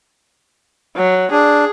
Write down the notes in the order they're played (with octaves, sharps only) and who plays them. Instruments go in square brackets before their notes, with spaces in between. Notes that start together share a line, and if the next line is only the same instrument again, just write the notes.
[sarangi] F#3
[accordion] D4 [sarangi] G#4